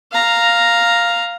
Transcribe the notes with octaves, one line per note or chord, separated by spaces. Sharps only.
F5 A#5